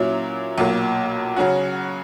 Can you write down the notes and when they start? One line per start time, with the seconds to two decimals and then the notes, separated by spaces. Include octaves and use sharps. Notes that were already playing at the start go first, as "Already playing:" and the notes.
Already playing: A#2 F#3 C#4 E4
0.58 B1 A#2 A#3
1.36 C#3 F#3 C#4 F#4